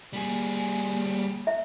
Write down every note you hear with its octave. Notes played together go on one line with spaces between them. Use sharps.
G3 A#3 G#4
E5